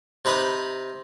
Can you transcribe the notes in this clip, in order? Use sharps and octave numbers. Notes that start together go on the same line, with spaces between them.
C3 D#4 B4 B5 D#6